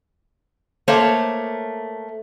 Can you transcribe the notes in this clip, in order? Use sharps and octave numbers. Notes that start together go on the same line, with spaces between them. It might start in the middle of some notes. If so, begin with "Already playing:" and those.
A3 A#3 A#4 C5 C#5